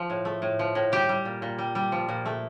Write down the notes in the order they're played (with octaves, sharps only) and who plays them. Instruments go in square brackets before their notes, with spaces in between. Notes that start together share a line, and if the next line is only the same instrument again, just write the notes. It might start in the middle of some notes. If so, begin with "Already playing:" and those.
Already playing: [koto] F3
A2
A3
A2
F3
A2
G3 G4
G3
A#2
A#2
G3
G3
F3
A#2
A3